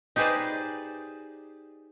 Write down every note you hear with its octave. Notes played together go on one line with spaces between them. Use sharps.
D#4 G4 G#4 B4 C5 D5